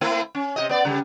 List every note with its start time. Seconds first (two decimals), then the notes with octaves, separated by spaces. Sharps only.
0.01 A3 C4 E4
0.35 C#4
0.56 C3 G4 D#5
0.69 B3 D5
0.85 C#3 G3